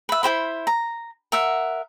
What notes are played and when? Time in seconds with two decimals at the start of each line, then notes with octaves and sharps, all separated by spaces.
0.09 B4 E5
0.23 E4 G4 C5 B5
0.67 A#5
1.32 A#4 E5 F#5